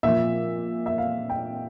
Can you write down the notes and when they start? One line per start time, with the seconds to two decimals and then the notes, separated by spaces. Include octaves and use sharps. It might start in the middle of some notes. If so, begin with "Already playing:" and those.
0.03 A#2 F3 E5
0.86 E5
0.98 F5
1.30 G5